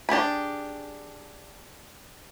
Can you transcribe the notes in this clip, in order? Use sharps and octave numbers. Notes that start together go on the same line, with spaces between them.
D4 G4 G#4 B5